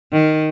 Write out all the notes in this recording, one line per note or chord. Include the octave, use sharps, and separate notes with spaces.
D#3